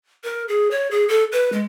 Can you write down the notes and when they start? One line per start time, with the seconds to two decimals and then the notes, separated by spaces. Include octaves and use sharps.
0.24 A#4
0.48 G#4
0.71 C#5
0.91 G#4
1.08 A4
1.32 B4
1.53 G#3